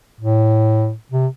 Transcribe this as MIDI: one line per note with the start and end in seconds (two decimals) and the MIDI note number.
0.20 0.93 45
1.12 1.27 48